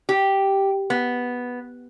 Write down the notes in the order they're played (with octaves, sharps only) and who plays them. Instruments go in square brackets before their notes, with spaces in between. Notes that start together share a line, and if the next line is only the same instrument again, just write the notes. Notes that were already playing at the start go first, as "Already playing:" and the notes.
[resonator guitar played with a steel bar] G4
B3